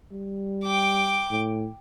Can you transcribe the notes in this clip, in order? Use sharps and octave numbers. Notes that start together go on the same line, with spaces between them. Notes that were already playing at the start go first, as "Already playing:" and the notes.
G3
G5 D6
A2